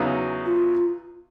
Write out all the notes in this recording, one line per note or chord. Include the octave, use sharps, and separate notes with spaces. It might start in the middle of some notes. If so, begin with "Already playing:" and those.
Already playing: E2 C#3 F#3 B3 D#4
F4